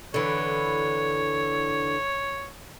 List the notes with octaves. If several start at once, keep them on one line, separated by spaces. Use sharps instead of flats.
D3 E3 C#5